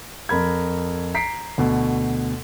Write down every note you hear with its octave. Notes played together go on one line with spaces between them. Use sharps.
F2 A#4 B5 G#6
A#5 B6 C7 D7
D2 B2